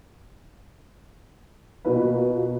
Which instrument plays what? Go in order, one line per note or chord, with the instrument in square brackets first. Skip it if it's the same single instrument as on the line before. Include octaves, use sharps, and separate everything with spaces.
[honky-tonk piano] B2 A#3 F4 A#4 B4